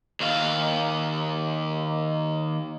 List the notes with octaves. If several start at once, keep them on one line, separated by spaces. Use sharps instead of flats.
D#2 F5